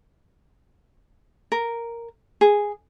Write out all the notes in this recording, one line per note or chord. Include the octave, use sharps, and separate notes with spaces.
A#4
G#4